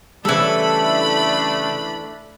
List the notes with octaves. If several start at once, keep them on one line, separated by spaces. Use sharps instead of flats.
C#3 E3 G3 A3 D4 A4 B5